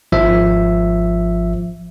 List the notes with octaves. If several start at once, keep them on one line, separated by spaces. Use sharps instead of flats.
G#1 F3 E5